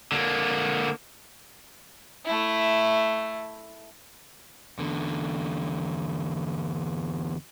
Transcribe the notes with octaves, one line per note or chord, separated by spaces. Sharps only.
D3 A#3
A3 E4
E2 D3